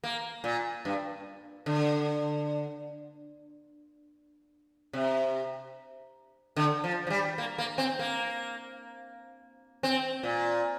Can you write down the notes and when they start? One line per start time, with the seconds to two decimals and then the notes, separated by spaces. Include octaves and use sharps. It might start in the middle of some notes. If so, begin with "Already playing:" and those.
0.04 A#3
0.44 A#2
0.85 G2
1.66 D3
4.93 C3
6.56 D3
6.84 F3
7.07 F3
7.10 G3
7.38 A#3
7.58 A#3
7.78 C4
7.99 A#3
9.83 C4
10.23 A#2